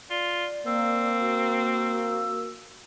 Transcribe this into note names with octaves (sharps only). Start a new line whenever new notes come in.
F4 D5
A#3 C4 E6
F#4